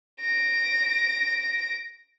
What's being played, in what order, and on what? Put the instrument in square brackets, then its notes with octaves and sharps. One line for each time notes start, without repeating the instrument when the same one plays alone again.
[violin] A#6 D7